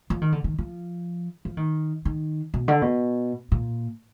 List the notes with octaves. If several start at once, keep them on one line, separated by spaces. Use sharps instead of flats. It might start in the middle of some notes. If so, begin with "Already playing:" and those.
F3
D#3
D3
D#3
F3
F3
D#3
D#3
B2
D3
B2
A#2